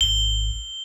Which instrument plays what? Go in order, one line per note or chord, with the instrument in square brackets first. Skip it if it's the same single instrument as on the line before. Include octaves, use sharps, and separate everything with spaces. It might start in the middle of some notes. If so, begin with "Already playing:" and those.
[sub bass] G#1 [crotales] G7